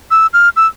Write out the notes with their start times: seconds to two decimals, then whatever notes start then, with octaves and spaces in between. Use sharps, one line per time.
0.11 E6
0.33 F6
0.56 E6